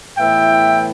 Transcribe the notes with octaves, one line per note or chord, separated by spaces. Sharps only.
A2 E3 B3 E5 G5